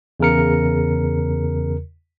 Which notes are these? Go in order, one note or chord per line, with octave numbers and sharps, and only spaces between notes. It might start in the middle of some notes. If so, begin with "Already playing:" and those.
E2 C#3 A#4 C#7